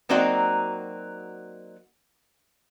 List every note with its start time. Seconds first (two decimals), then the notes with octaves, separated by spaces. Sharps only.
0.09 F#3 A#3 C4 D#4 F#4 D5